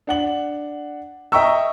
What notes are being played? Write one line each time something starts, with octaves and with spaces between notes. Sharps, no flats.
D4 F#5 F#7
D#5 E5 G5 A#5 C#6 E6